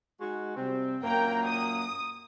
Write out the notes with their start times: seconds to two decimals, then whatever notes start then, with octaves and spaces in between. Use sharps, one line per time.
0.21 G#3 D#4 F#4
0.56 C3 G3 C4
1.04 F#2 A#2 A#3 A#4 G5 A#5
1.47 D#6